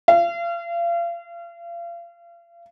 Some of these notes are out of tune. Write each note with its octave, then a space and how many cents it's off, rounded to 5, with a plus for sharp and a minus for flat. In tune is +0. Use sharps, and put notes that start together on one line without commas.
F5 -35